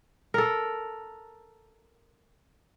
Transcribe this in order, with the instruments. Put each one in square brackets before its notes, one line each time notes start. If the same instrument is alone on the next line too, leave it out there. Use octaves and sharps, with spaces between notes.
[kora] A4 A#4